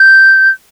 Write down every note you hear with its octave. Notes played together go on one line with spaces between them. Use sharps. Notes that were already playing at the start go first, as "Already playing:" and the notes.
Already playing: G6